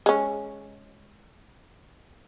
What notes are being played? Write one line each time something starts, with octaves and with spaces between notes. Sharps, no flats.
G#3 C#4